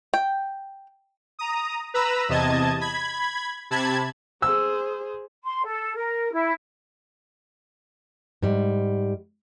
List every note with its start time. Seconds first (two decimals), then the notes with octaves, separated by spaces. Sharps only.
0.14 G5
1.39 A#5 D#6
1.94 B4 A#5 B5 E6
2.29 E2 C3 D#5 A5 G#6
2.81 B5 G#6
3.71 C3 A5 B5 G#6
4.42 G#4 C5 E6
5.45 C6
5.64 A4
5.96 A#4
6.32 E4
8.42 G#2 G3